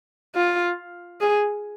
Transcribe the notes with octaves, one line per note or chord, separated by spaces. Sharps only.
F4
G#4